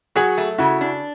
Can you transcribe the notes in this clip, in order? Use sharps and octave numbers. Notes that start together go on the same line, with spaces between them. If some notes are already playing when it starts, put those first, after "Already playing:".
F#3 F#4 G#4
A3
C#3 E4 F#4
D4